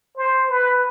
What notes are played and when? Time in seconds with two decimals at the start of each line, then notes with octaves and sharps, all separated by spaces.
0.17 C5
0.49 B4